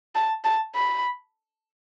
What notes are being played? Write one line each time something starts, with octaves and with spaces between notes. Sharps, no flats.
A5
A5
B5